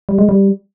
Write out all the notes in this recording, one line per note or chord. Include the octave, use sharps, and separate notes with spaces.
G3
G#3
G3